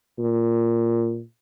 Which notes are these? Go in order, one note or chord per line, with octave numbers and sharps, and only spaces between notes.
A#2